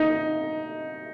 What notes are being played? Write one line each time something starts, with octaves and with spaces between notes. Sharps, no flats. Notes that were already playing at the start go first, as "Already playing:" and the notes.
Already playing: D#4